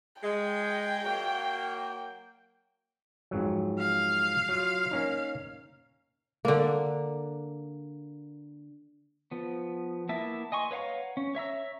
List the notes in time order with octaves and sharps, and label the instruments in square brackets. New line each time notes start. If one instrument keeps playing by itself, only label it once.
[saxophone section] G#3 [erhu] G5
[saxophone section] F#3 A#3
[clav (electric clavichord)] F2 G#2 F#3
[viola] F5
[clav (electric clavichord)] F#3 F4
A#3 C#4 D#4
[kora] D3 A#3
[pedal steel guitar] F3 B3
A#3 B3 E4 E5 A5
D#5 G#5 C6 C#6
B4 C#5 F5 F#5 A#5
C#4
C#5 E5 A#5 E6